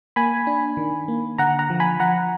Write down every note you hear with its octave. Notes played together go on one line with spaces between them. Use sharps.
A#3 G#5 B5
D4
D#3
A#3
D3 F#5 A#5
F#5 A#5
F3
G#5 B5
F3 F#5 A#5